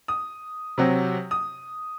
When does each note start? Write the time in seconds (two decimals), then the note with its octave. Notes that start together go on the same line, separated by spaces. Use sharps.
0.08 D#6
0.78 C3 F#3 C4
1.31 D#6